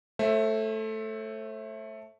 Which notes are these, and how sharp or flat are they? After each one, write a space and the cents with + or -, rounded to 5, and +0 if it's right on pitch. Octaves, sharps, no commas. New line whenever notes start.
A3 +0 C5 +45 E5 +0